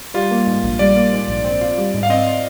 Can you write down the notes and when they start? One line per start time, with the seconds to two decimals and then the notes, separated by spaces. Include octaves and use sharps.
0.14 G3 F4
0.31 A#3
0.47 G#2
0.63 A#1
0.79 G3 D5
0.96 A#3
1.12 G#2
1.28 A#1
1.44 C4
1.61 F4
1.78 G3
1.94 G#2
2.03 F5
2.10 C4 D#5
2.27 F4